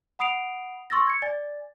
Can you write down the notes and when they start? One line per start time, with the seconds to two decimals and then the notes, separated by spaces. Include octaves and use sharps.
0.19 F#5 B5 D#6 C7 D7 F7
0.90 C6 C#6 E6 A6 A#6
1.07 G#6 C#7
1.22 D5 G#5 A6